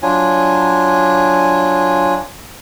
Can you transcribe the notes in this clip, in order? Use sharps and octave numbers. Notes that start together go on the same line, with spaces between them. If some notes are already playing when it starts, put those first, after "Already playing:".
F#3 D4 F4 G#5